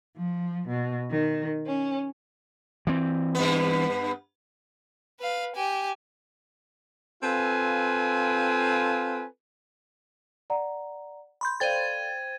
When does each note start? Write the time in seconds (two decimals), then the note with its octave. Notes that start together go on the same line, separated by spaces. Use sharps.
0.17 F3
0.69 B2
1.10 D#3
1.66 C#4
2.87 E3 C4
3.35 G2 B3
5.20 B4 F5
5.55 G4 G#5
7.22 C4 F4 A4 B4 F5 G#5
10.50 D5 F#5 A#5
11.41 B5 C6 G6
11.60 A4 C5 D5 F5 G5 G#6 A6 D#7